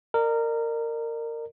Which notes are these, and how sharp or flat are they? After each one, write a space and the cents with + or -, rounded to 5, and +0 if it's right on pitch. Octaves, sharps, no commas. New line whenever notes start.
A#4 -20 D5 +45